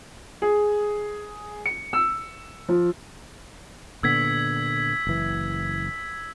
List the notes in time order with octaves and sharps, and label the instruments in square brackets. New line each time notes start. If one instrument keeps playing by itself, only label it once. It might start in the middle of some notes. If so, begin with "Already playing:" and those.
[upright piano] G#4
C#7
E6
F3
[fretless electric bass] A#2 D3 B3 [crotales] E6 G#6 B6
[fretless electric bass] F#1 E3